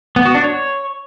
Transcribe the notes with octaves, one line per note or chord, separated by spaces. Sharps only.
B3
F#4
D4
C#5